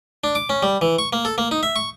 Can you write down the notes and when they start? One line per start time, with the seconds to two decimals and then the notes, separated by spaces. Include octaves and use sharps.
0.24 D4
0.35 D6
0.49 C#4
0.63 G3
0.82 E3
0.99 C#6
1.13 A#3
1.25 A4
1.38 A#3
1.51 D#4
1.63 E5
1.76 C#6